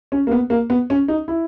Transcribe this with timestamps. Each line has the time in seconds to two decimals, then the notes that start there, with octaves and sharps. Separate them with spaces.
0.12 C#4
0.27 A#3
0.31 B3
0.50 A#3
0.70 B3
0.90 C#4
1.08 D#4
1.28 E4